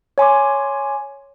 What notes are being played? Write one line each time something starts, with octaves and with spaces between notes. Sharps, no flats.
C#5 G#5 C6 D6